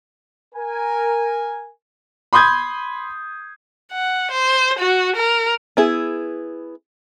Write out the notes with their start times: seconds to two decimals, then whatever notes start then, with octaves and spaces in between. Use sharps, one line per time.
0.55 A#4 G#5
2.33 B5 C6 D#6 G6 G#6
3.92 F#5
4.31 C5
4.79 F#4
5.16 A#4
5.77 B3 E4 G#4